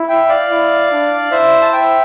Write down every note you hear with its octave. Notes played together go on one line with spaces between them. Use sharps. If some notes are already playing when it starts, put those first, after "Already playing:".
Already playing: E4
E5 G5
D5 F5
E4
D4
E4 C5 E5
A5
E5 G5